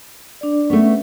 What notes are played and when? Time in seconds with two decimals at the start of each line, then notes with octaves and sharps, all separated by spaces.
0.41 D4 D5
0.70 A3 B3 C#4 E5